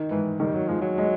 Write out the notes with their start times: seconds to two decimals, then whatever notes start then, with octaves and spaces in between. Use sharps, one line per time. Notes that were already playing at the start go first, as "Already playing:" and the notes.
Already playing: D#3
0.11 G#2 E3
0.40 D#3 G3
0.54 F#3
0.67 F3 G#3
0.81 F#3
0.98 G#3